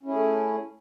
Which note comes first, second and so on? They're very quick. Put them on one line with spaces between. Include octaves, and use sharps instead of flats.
C#4 E4 G#4 A3